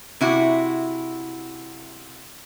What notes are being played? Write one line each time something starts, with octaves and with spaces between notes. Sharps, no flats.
C3 E4 F#4